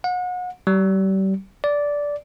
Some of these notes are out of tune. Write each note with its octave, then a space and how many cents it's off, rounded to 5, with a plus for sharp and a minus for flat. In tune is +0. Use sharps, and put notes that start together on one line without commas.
F#5 -35
G3 -35
D5 -10